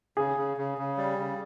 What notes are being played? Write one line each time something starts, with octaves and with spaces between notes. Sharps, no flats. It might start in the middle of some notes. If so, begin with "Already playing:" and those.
C#3 G#4
C#3
C#3
C#3
G3
C#3